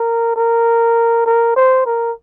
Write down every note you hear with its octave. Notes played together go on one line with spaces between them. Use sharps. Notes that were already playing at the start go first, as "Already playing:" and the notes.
Already playing: A#4
A#4
A#4
C5
A#4